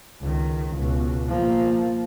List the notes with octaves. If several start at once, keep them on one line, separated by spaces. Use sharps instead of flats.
C#2 D#3
C#2 B2
F3 A#3